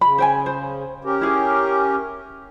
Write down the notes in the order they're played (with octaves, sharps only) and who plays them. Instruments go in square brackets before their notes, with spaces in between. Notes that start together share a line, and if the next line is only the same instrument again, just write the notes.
[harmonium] C#3 [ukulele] B5
[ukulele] C5 G5 G#5
C5
[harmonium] C#4 G4 A#4
[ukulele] E4 G#4